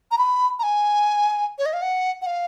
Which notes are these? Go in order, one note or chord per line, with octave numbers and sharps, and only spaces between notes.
A#5
B5
A#5
G#5
C#5
D#5
F5
F#5
F#5
F5